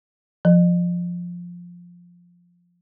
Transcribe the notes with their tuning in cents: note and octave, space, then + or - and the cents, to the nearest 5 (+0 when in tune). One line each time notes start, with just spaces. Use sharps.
F3 +5